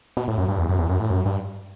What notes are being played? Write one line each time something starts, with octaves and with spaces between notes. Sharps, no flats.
B2
A2
F#2
G2
E2
F#2
E2
F#2
A2
F#2
G2